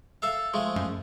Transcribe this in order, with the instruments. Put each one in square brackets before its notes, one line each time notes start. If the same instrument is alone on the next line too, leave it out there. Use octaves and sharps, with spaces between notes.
[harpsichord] A4 E5 F5
F3 G#3 A3
[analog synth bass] F#2